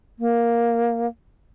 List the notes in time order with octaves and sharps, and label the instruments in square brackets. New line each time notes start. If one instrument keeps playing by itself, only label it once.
[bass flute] A#3